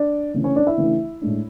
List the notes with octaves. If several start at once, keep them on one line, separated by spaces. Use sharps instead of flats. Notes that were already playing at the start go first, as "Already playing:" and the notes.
Already playing: D4 D5
C#3 E3 A3 D4
C#4 C#5
D4 D5
E4 E5
C#3 E3 A3 D4
A2 G#3 D4